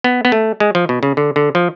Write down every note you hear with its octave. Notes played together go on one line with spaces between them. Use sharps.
B3
B3
A3
G#3
F3
B2
C#3
D3
D3
F3